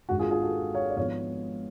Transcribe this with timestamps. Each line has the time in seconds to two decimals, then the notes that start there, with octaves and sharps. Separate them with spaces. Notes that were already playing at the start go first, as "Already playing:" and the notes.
0.09 G#1 G#2 G#3 D4 F#4
0.19 F4 G#4
0.31 F4 G#4
0.42 F#4 A4
0.75 C#5 F5
0.90 D5
0.97 G#1 G#2 F3 G#3 B3 C#5 F5